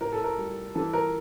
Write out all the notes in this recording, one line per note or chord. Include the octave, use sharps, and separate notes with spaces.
A2 A#4
A4
A#4
G3
E3 A4
A#4